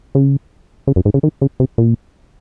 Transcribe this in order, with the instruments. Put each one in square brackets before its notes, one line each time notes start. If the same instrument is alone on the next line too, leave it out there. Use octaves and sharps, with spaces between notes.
[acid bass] C#3
C#3
F#2
G#2
C#3
D#3
C#3
C3
A#2